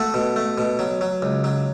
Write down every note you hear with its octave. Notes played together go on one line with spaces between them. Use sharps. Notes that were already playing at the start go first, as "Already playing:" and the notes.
Already playing: A3 F#4 A4
B2
A3
B2
F#3
F#3
C#2
F#3